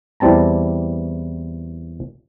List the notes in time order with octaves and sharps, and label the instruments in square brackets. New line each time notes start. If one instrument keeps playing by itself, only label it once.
[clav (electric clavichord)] E2 E3 G3 C4 A5 A#5